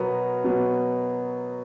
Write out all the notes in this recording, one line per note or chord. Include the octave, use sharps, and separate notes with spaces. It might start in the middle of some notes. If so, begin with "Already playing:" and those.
Already playing: B2 F#3 B3 A#4
B2 F#3 B3